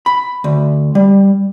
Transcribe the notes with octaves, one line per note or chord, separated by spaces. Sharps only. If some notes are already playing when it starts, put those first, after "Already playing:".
B5
D2
G3